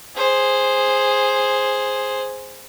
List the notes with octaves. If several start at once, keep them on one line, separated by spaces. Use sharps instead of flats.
G#4 C5